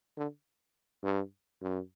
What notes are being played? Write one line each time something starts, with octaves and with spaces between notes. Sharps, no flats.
D3
G2
F#2